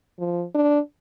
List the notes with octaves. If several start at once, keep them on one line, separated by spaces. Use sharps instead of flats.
F3
D4